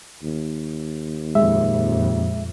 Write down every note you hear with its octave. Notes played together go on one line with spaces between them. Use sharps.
D#2
F2 A#2 G#3 E5